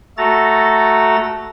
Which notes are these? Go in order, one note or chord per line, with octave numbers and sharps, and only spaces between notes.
A3 F#4 A4 A#5 A6